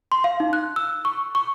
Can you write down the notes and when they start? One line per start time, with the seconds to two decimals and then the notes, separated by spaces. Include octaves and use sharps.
0.12 C6
0.24 F5
0.40 D#4
0.53 F#6
0.76 E6
1.05 C#6
1.35 C#6